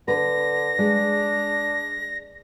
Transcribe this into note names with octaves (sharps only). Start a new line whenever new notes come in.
D3 B4 A#6
G#3 D4